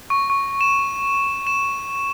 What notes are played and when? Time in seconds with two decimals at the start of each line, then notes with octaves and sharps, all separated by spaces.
0.10 C#6
0.30 C#6
0.61 E7
1.47 E7